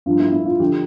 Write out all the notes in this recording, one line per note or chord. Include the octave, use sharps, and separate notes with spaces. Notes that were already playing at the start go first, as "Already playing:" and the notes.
G2 F3 F4
E4
E4
F4
D3 F3 G4